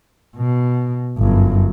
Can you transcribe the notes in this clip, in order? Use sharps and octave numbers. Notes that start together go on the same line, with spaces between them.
B2
G1 F#2